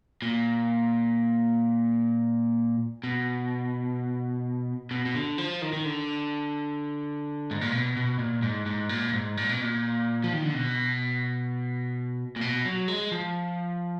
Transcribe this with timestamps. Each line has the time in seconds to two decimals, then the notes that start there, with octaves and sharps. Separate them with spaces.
0.22 A#2
3.04 B2
4.91 B2
5.06 B2
5.15 D3
5.38 F3
5.62 D#3
5.73 D#3
5.85 D3
7.51 G#2
7.61 A#2
7.72 B2
7.96 B2
8.19 A#2
8.42 G#2
8.66 G#2
8.89 A#2
9.13 G#2
9.37 A#2
9.49 B2
9.61 A#2
10.24 F3
10.33 D#3
10.44 D3
10.54 B2
12.36 A#2
12.41 B2
12.65 F#3
12.88 G#3
13.12 F3